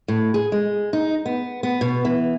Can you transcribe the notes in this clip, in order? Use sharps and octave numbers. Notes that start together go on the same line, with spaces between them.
A2
G#4
G#3
D#4
B3
B3
B2
E3